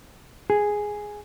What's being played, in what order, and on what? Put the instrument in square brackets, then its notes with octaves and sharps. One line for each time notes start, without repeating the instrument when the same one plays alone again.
[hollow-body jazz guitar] G#4